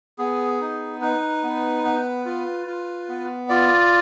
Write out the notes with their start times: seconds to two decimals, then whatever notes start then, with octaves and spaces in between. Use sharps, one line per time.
0.18 B3 G#4
0.61 D#4
1.01 D#4 B4
1.43 B3
1.84 B3
2.25 F4
2.66 F4
3.09 B3
3.49 F4 D5